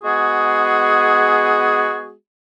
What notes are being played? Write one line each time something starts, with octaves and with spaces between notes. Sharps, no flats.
G#3 B3 F#4 G#4